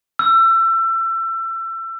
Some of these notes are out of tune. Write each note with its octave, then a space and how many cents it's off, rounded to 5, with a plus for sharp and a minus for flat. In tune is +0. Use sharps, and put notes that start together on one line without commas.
E6 +30